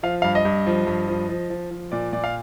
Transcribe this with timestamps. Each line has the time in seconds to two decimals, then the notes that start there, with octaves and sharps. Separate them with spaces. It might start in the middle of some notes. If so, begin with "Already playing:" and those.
0.03 F3 F5
0.22 G2 F5
0.35 D#5
0.45 G2
0.67 F3
0.87 G2
1.08 F3
1.29 F3
1.50 F3
1.71 F3
1.92 A#2 D5
2.13 A#2 D5
2.24 F5